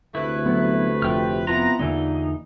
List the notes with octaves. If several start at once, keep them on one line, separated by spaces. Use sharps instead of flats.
D2 C3 A3 E4 B4
F#3 B3
F1 F3 G4 G5 F6
B3 C4 E4 F4 B4 A#5
E2 G2 A#2 D3 E3 A#3 D#4